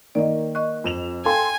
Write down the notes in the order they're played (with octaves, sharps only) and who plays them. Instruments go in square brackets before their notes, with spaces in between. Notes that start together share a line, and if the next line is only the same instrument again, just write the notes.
[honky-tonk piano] D#3 A#3 [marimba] D5 D#5
[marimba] D#5 C#6 F#6
[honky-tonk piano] F2 E7 F7
[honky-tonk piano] A4 C6 [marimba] F5 G5 [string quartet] G#5